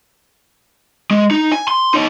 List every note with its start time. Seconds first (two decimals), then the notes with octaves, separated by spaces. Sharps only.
1.11 G#3
1.31 D#4
1.52 G#5
1.68 C6
1.94 D#4 C#5